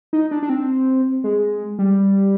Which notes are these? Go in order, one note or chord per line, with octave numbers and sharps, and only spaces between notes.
D#4
D4
D4
C4
G#3
G3